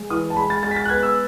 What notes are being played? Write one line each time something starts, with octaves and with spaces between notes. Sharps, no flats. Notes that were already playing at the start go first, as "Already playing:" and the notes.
Already playing: G#3
E3 D#6
A5
G#3 B5
A6
G#3 A6
B6
A6
F#6
B3 G#6
E6